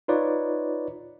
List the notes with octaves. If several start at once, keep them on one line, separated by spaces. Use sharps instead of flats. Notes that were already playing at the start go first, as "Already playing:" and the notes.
D#4 F4 B4 C#5 D5